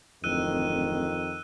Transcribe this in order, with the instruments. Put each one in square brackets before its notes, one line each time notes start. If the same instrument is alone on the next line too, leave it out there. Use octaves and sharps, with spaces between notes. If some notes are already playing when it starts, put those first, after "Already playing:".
[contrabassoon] D1 [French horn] F2 [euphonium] D#3 [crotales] E6 F#6 D#7